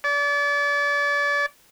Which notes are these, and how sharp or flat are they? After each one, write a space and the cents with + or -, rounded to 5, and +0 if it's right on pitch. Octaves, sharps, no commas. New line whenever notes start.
D5 -35